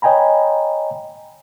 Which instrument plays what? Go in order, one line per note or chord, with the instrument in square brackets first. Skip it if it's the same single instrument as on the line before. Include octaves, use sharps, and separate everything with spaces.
[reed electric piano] C#5 D#5 G5 G#5 A#5 B5